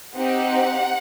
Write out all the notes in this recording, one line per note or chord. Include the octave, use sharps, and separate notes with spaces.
C4 D#4 G4 F#5